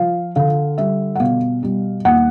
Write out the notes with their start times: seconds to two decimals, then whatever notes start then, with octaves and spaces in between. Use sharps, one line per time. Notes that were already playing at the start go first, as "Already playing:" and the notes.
Already playing: F3 F5
0.36 D3 F5
0.78 G3 E5
1.15 F#5
1.20 B2 F5
1.63 G3
2.05 D#2 F#5